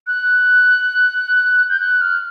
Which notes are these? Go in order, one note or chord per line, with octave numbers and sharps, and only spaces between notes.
F#6
G6
F#6
F6